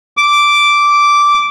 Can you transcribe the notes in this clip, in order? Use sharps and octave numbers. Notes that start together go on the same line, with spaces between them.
D6